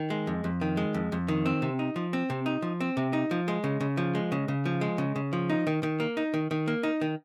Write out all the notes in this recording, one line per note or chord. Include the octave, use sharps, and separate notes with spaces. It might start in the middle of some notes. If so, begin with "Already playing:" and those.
Already playing: D#3
G#3
F2
F2
D#3
G#3
F2
F2
D#3
C4
C3
D#4
F3
C4
C3
D#4
F3
C4
C3
D#4
F3
G#3
C#3
C#3
F3
G#3
C#3
C#3
F3
G#3
C#3
C#3
F3
D#4
D#3
D#3
A#3
D#4
D#3
D#3
A#3
D#4
D#3